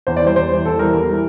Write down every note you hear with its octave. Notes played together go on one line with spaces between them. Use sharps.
E2 C5
D5
E3 G3 C5
E2 C5
E3 G3
E2 A4
E3 G3 A#4
E2
E3 G3